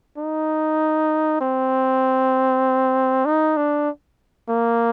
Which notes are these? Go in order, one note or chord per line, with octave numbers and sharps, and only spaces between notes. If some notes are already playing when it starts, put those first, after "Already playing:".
D#4
C4
D#4
D4
A#3